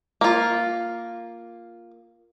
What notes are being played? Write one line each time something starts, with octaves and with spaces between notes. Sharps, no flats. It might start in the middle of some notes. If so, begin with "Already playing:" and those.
A#3 F4